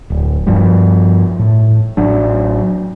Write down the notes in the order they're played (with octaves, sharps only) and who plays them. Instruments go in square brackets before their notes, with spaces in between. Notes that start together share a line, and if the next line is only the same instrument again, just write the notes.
[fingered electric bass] D1
G2 F3 G3
A2
A1 F#3 D4